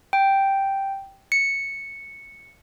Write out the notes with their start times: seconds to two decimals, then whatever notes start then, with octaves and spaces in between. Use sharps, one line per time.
0.13 G5
1.32 C#7